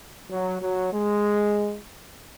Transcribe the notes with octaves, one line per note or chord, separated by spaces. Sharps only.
F#3
F#3
G#3